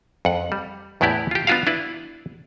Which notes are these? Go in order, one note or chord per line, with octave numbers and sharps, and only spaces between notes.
F2 F#5
G3
E2 A2 B3 E4 G4 D5
F4 G4
B3 D4 F4 F#4 F5
D4 E4 B4